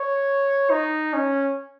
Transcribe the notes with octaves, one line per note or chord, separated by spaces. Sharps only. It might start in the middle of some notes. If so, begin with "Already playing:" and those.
Already playing: C#5
D#4
C#4